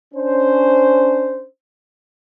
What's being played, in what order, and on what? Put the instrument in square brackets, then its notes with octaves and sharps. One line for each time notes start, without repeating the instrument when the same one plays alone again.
[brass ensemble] C#4 D4 C5